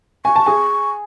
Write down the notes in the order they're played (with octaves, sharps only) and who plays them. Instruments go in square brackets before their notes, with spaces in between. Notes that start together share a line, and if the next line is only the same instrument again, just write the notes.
[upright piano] G#5 [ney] C#6
[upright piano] A5
G#4 G#5